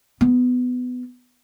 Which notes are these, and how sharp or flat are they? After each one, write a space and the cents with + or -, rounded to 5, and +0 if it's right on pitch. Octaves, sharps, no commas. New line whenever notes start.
B3 +15